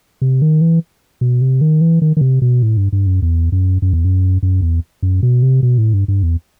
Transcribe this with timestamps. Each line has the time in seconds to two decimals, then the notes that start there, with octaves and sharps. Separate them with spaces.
0.22 C3
0.42 D#3
0.61 E3
1.21 B2
1.41 C3
1.61 D#3
1.81 E3
2.02 D#3
2.17 D#3
2.21 C3
2.42 B2
2.62 A2
2.77 G2
2.93 G2
3.07 F#2
3.22 E2
3.52 F#2
3.82 F#2
3.93 E2
4.05 F#2
4.43 F#2
4.62 E2
5.03 F#2
5.23 B2
5.42 C3
5.63 B2
5.78 A2
5.93 G2
6.08 G2
6.23 E2